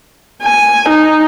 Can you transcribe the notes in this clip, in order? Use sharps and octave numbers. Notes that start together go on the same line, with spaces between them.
G#5
D#4